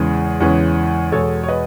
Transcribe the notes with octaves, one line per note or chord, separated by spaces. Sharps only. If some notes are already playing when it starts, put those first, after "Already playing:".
Already playing: E2 C#3 E3 G#3 C#4
E2 C#3 E3 G#3 C#4
E2 B2 G#3 A4 C#5
C#5
B4 D#5